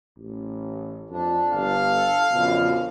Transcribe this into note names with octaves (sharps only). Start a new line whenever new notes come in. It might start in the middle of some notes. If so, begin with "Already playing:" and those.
A1
F2 D4
G1 F5
A4
F#2 B2 D3 F3